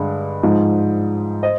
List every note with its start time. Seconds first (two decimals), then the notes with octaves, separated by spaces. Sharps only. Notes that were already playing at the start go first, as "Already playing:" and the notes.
Already playing: G2 D3 G#3
0.43 G#2 F3 G#3
1.43 C5 D#5